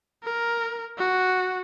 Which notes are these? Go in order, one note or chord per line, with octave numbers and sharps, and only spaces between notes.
A#4
F#4